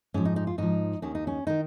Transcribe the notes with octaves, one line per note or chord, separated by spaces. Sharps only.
G#2 F3 C#4
D#4
D#4
F4
G#2 F3 D#4
D#2 D#3 C#4
D#4
C#4
D#3 D#4